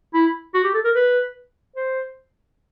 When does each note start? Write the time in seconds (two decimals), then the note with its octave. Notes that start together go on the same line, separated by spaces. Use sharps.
0.14 E4
0.55 F#4
0.65 G4
0.75 A4
0.85 A#4
0.96 B4
1.76 C5